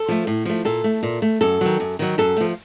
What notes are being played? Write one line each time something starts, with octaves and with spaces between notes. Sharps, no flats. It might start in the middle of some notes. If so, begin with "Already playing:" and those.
Already playing: A4
F3 A3
A2
F3 A3
A#2 A4
A3
A#2
A3
F#2 A4
D#3 F#3
F#2
D#3 F#3
F#2 A4
F3 A3